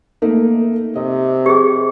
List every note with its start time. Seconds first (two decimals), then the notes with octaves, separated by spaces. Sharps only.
0.22 A3 A#3 D#4
0.95 C3 D#5
1.46 G4 G#4